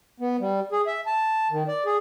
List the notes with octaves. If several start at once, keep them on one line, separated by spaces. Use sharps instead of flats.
B3
G3
G#4
E5
A5
D#3
D5
G#4